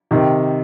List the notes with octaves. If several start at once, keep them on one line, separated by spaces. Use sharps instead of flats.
C3 D#3